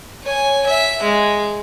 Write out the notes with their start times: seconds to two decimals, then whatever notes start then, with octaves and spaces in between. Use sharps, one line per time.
0.23 C#5 G#5
0.66 E5
1.03 G#3